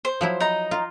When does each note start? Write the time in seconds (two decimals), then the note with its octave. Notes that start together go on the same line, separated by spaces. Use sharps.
0.05 C5
0.21 F3 F#3 E4
0.40 D#4 A#5
0.71 F4